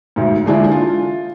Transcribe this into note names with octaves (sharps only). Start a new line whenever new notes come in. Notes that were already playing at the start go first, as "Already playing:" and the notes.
D2 G#2
D3 E3 G#3 D4 E4 F4
F4